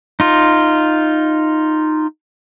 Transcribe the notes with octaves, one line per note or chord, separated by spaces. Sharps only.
D#4 F4